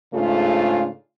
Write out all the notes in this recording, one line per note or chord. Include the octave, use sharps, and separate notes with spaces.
G#2 C#3 A3 D4 F4